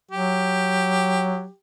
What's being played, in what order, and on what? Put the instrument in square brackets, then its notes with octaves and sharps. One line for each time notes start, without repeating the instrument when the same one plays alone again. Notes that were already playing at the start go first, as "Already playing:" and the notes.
[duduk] F#3 [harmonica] G4